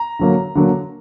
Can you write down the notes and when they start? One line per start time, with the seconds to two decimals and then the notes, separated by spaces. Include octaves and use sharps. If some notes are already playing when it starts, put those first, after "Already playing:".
Already playing: A#5
0.19 D3 F#3 A#3
0.55 D3 F#3 A#3